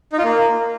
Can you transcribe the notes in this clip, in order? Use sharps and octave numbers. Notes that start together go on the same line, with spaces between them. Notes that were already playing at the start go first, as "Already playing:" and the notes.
D#4
F4
A#3